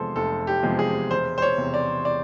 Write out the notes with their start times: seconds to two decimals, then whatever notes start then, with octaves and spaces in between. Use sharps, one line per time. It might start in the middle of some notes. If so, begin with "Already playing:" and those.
Already playing: F1 E2 C3 F3 G#3 A4 C5
0.16 F1 A4
0.47 G4
0.63 E2 C3 F3 G#3
0.79 G#4
1.11 E1 C5
1.38 C5
1.42 C#5
1.58 E2 C3
1.74 D5
2.05 D5